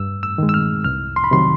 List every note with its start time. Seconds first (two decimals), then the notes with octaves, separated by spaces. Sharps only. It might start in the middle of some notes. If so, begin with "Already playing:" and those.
Already playing: G2 E6
0.23 E6
0.38 D#3 G#3
0.49 E6
0.54 F6
0.84 C2 F6
1.16 C6
1.24 B5
1.31 C3 D#3 F#3 C6